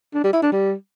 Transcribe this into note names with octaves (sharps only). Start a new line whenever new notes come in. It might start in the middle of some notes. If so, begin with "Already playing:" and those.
D4
G3
E4
D4
G3